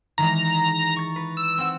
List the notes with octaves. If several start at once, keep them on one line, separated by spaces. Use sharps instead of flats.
D#3 E3 G#3 A#5
C#6 A6
B4
E6
C4 F#5